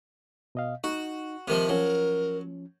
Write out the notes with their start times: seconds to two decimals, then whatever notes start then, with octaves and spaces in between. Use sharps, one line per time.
0.55 B2 D#5 F5
0.84 D#4 F#4
1.48 C3 D#3 F3
1.69 F3 F#3 C#4 A#4